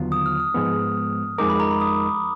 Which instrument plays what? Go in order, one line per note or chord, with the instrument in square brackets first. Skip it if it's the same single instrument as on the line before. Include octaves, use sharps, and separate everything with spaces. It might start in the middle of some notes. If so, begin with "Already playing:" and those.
Already playing: [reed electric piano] D#2 D3 F#3 B3 F4
[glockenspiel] D#6
F6
D#6
[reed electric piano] G#2 F3 G#3 B3
[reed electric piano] F2 F3 G#3 D#4 A#4 [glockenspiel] D6
[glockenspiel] B5
A#5
B5
D#6